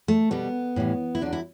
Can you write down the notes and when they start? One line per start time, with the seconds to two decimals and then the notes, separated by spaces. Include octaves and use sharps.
0.08 A3
0.31 B2 G3 B3
0.76 A2 E3 G3
1.15 E4
1.21 E2 D3 F#3 D4
1.33 E4